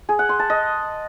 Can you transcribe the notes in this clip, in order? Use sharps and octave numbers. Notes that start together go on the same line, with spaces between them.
G#4
F#5
C6
A5
D#5